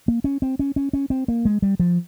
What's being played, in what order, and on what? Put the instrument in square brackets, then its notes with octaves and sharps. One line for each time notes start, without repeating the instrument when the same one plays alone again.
[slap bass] A#3
C#4
C4
C#4
C#4
C#4
C4
A#3
G#3
G3
F3